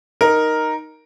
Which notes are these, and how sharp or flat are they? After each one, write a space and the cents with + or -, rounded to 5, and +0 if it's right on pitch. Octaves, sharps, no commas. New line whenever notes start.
D#4 +0 A#4 +0